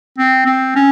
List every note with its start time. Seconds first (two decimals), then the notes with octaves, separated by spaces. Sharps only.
0.18 C4
0.46 C4
0.75 C#4